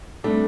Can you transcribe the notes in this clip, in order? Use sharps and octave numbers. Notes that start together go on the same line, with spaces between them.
C3 G3 A3 D4